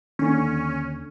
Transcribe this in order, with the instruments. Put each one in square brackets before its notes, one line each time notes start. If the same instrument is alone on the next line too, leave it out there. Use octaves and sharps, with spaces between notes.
[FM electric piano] D#2 D3 [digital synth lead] C#4